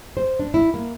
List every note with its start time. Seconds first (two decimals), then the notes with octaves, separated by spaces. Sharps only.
0.17 C5
0.40 D4
0.54 E4
0.74 A#3